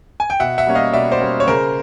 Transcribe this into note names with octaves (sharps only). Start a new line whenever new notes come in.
G#5
G5
B2 E5 F#5
E5 F#5
G3 A#3 C#4
D#5 F5
B2 D5 E5
C5 D5
G3 A#3 C#4
C#5
C#3 A#4 C5